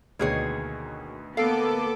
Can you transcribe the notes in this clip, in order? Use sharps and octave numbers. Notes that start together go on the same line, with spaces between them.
D2 B2 D#3 A#3 G#4 C#5
A#3 B3 A4 F5 D6